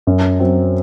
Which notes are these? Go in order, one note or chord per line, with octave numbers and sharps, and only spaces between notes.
F#2
F#3 C4